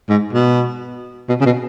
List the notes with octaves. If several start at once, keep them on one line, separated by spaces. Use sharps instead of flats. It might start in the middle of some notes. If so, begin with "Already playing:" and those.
G#2
B2
B2
C#3
B2